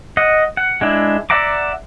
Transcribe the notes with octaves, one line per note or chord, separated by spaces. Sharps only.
D#5 F#5
F#5
G#3 D4 E4
D5 E5 F#5 A#5 D6